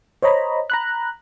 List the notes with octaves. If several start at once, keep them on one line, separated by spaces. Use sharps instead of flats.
C5 C#5 D#5 A#5 B5
A#5 B5 F#6